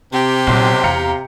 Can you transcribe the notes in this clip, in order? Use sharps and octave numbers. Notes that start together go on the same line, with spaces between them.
C3 G4
B1 A#2 F#3 C6
E2 F5 A#5 C#7